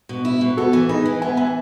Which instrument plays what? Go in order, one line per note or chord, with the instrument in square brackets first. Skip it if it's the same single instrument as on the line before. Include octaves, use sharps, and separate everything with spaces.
[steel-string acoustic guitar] B2
E4
B2
[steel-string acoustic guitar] B3 [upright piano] F#4 A4
[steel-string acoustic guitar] E3
[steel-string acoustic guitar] D#4 [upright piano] G#4 B4
[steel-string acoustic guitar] E3
[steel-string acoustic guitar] B3 [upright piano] E5 G#5
[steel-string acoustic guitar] E3 [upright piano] E5 G#5